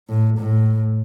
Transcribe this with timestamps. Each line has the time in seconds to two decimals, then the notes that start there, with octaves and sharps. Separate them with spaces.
0.09 A2
0.38 A2